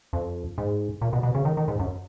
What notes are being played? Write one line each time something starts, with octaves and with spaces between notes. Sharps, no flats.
F2
G#2
A#2
B2
B2
C#3
D#3
D#3
G#2
F#2